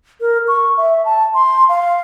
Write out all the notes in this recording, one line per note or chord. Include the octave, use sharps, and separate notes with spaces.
A#4
C#6
E5
A5
C6
F5